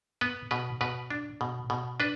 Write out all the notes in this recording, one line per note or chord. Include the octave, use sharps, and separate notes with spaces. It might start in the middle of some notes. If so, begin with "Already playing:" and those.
B3 B4
B2 B4
B2 B4
D4
B2
B2
D4 B4